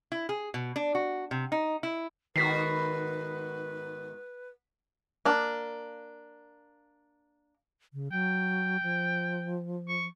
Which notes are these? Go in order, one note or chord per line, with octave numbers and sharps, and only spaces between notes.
E4
G#4
B2
D4
F#4
C3
D#4
E4
G#2 D#3 B3 F#4 B4 B6 C7
A#3 D4
C#3
F#3 G5
F3
C#6